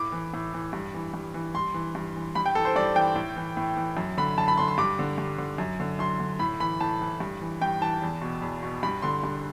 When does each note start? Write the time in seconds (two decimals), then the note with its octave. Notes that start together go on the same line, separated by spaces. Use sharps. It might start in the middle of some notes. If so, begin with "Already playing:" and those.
Already playing: A2 D6
0.12 E3
0.34 A2
0.53 E3
0.73 G2
0.94 E3
1.14 G2
1.34 E3
1.54 G2 C6
1.74 E3
1.95 G2
2.16 E3
2.35 G2 B5
2.46 G5
2.55 E3 A4
2.65 C5
2.76 G2 D5
2.96 E3 G5
3.16 A2
3.36 E3
3.57 A2
3.77 E3
3.97 F#2
4.17 D3 B5
4.38 F#2 A5
4.48 B5
4.58 D3 C6
4.68 C6
4.78 G2 D6
4.99 D3
5.18 G2
5.38 D3
5.58 F#2
5.80 D3
5.99 F#2 C6
6.20 D3
6.39 A2 B5
6.60 E3 B5
6.80 A2 A5
7.01 E3
7.20 G2
7.41 E3
7.61 G2 G5
7.81 E3 A5
8.02 E2
8.22 B2
8.42 E2
8.63 B2
8.83 G2 B5
9.02 D3 C6
9.24 G2